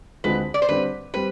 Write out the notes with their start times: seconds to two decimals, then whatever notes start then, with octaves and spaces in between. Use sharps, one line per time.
0.24 D2 D3 G#3 C4 F4 B4
0.54 D5
0.62 C5
0.69 D3 G3 C4 B4
1.14 G3 C4 B4